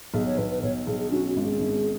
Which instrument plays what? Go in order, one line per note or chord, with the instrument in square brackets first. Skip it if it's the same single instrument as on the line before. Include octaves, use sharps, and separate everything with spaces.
[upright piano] B1 [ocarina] G#4
[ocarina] C#5
[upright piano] B1 [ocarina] B4
[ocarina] B4
[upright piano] B1 [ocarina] C#5
[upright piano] B1 [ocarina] G#4
[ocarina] G#4
[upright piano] C#4 [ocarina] F#4
[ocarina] F#4
[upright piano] G#1
[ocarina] G#4
[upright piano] G#1